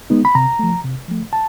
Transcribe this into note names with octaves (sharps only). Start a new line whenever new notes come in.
G#3 B3 D#4
B5
C3 A#5
F3 A3
C3
F3 A3
A5